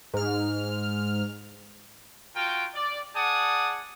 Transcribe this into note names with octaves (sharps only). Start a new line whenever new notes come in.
G#2 F6
F4 F#4 A#4 G5
D5
G#4 D5 F#5 A5 D#6